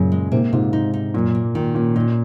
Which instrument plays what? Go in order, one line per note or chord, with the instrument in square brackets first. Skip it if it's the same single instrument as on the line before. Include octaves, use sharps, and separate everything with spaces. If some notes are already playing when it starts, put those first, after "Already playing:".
Already playing: [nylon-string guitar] F#2 [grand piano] A#2 C#3
[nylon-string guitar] G#3
[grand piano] G#2 C3 [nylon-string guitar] A#3
[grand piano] G#2 C3 [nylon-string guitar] F4
[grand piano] G#2 [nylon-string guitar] D#4
[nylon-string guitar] D#4
[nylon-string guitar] F#2 [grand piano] A#2
[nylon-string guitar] A#3
[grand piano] A#2 [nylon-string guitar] D#3
[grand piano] A#2 [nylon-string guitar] C#4
[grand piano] A#2 [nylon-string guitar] D#4